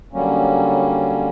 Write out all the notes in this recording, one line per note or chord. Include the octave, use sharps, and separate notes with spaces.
D3 F#3 G3 A#3 C#4